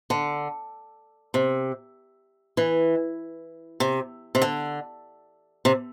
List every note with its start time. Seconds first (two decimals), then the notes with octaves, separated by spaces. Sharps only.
0.10 D3
1.34 C3
2.57 E3
3.80 C3
4.35 C3
4.42 D3
5.65 C3